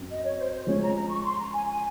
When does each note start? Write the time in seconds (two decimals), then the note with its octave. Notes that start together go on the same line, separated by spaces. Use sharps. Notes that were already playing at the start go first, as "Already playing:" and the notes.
Already playing: F#2 C4
0.10 D#5
0.24 C#5
0.38 C5
0.52 C5
0.67 F3 G#3 C#4 C#5
0.81 A#5
0.95 A#5
1.09 C#6
1.25 C6
1.39 A#5
1.52 G#5
1.67 G#5